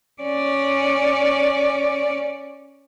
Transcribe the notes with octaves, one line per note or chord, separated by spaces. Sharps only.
C#4 D5